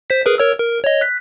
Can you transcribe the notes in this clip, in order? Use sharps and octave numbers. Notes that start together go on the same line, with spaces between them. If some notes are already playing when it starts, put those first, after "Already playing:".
C5 B6
G#4 A#4 B4
A#4 C#5 E6
A#4
C#5 D#5
F#6 B6